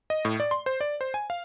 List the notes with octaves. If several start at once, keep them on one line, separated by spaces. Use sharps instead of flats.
D#5
A2
D5
C6
C5
D5
C5
G#5
F5